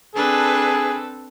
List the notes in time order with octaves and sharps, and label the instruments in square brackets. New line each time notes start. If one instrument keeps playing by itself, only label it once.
[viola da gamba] C4 A4 [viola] D4 B4 [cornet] G#4